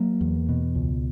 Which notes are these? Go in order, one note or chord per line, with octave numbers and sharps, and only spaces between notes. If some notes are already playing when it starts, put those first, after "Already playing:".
Already playing: F#3 A#3
E2
B2
C#2